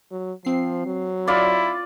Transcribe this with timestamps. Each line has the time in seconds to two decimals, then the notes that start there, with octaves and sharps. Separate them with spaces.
0.11 F#3
0.45 F3 C4 C7
0.86 F#3
1.28 E4 F4 D5